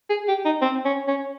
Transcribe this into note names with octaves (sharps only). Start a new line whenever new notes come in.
G#4
G4
D#4
C4
C#4
C#4